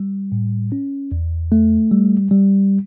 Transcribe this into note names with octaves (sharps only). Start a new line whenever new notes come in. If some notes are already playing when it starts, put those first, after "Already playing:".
Already playing: G3
A2
C#4
E2
A3
G3
G3